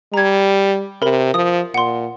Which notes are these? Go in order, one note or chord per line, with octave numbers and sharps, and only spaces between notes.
G3 A#5 G#6
C3 A#4 B5
F3 D#6
A#2 F#5 C6